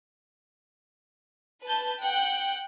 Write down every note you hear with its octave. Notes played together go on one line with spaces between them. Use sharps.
B4 A5 G6
F#5 G5 F#6